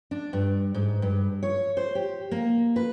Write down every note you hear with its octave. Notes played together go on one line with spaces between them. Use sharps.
D4
G2
G#2
G2
C#5
C5
G4
A#3
B4